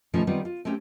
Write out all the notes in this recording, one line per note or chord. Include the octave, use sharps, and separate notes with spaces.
B2 D#3 F3 A3 C#4
D#3 G3 B3 C4 F4
F4
A3 C4 C#4 G4